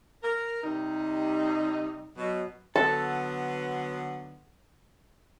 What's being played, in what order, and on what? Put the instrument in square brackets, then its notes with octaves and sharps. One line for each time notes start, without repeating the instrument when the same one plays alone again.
[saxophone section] A#4
C3 G3 D#4
B2 F#3
[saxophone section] D3 F#3 B3 [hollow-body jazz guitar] A4 [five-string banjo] A5